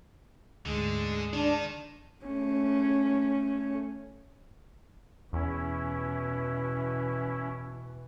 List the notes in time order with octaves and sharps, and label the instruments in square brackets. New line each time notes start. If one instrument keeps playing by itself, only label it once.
[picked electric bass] D2 G#2 [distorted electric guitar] D3 [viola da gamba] G#3
[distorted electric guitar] D#3 [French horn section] D4
[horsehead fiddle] A3 C#4
[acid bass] E2 [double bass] B2 E3 [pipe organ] C#4 E4